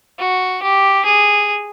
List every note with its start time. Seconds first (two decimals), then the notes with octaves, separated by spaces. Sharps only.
0.19 F#4
0.63 G4
1.05 G#4